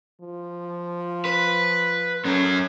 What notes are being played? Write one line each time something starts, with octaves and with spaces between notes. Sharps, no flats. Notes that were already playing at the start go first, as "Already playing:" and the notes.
F3
B4
F#2 C#4 A4